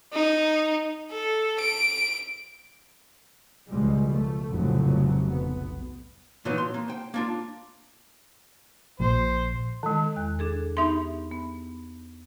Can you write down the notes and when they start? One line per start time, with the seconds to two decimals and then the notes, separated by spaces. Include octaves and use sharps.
0.13 D#4
1.11 A4
1.60 D7
3.70 C#2 B2 F3 G3 G#3
4.11 A3
4.50 F1 C#2 A2 C#3 F#3
5.32 B1 B3
6.45 A#2 E3 F#3 B3 D#4
6.58 C6
6.74 A#3
6.88 C5 G5
7.14 A#3 D4 F4
9.00 A#1 A#2 C5
9.83 D#3 G#3
10.16 E2 F#6
10.39 D4 G#4 A4
10.77 B3 D#4 G4 E5 C6
11.32 B3